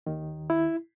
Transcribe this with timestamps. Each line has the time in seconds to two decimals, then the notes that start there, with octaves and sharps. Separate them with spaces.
0.07 D#2 D#3
0.50 E4